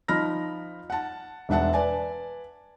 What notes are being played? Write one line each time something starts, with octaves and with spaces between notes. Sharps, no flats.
F3 D#4 B5 F6 A#6
F#5 A5
E1 D4 E5 F#5 A5
B4 D5 G#5 A5